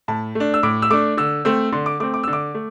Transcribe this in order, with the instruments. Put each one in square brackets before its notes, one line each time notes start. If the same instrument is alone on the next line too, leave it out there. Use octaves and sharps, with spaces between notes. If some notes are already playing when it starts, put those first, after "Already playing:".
[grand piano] A2 A5
A3
D4
E6
A2 D6
E6
A3 D4 D6
D3 E6
A3 C4 E6
D3 C6
D6
A3 C4 D6
D6
D3 E6
D6
A3